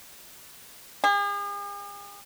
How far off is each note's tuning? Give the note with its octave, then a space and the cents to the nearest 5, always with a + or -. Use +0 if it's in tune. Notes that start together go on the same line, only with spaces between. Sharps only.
G#4 -45